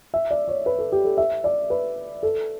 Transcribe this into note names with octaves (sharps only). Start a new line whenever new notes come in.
E5
D5
C#5
B4
A4
G4
A4
E5
D5
B4
A4